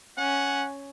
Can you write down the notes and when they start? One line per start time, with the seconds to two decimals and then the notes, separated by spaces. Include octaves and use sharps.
0.18 C#4 F#5